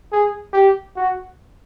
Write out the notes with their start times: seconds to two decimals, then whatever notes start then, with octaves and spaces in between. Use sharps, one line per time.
0.13 G#4
0.54 G4
0.96 F#4